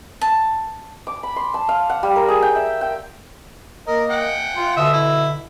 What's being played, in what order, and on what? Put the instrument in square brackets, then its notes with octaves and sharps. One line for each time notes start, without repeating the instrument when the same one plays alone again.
[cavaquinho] A5
[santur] D6
B5
C6
A5
F5
F#5
G3
A#4
G#4
G5
E5
G5
[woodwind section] A#3 D#5 [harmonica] A#4
[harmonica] F#5 G5
[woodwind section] F4
[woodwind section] B2 D3 [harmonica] E5 D#6 E6
[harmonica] E4